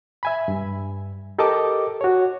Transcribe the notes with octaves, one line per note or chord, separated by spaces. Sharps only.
E5 G#5 B5
G2
G4 A4 A#4 D#5 A5 D6
F#4 C#5